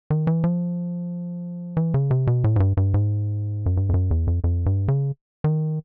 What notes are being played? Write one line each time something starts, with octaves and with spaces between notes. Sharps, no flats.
D#3
E3
F3
E3
C#3
C3
B2
A2
G#2
G2
G2
G#2
F#2
G2
F2
F#2
E2
F2
F2
G2
C#3
D#3